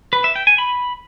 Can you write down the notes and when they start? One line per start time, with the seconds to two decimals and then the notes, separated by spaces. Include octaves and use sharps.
0.13 B4
0.24 E5
0.36 G5
0.47 G#5
0.58 B5